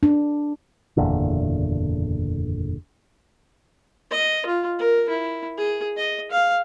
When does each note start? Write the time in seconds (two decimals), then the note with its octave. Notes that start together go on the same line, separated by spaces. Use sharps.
0.03 D4
0.97 F#1 E2 A#2 D3
4.11 D#5
4.46 F4
4.79 A#4
5.09 E4
5.58 G#4
5.97 D#5
6.31 F5